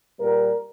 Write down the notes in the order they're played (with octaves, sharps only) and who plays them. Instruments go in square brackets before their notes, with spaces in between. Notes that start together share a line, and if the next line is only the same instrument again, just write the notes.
[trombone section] A#2 G3 A#4